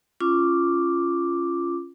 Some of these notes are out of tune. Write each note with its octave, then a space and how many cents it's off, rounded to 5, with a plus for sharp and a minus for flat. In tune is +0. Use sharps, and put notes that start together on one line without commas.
C#4 +0 F4 -15 D6 +0